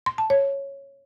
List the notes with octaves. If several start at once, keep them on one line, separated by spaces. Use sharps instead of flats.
C6
A5
C#5